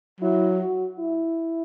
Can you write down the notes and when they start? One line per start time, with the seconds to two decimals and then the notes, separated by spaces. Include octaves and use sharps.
0.21 F#3 E4
0.60 F#4
0.99 E4